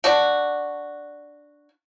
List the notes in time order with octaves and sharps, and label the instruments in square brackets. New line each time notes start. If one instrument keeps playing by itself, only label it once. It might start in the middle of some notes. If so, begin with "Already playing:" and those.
[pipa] D4 F#4